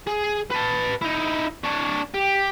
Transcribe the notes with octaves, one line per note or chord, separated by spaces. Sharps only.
G#4
B4 A5
D#4 E4
D4 C#5
G4